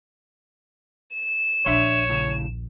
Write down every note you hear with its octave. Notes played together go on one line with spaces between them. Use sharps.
E7
A#1 D#2 D4 C#5 E5 C6
A2 C#3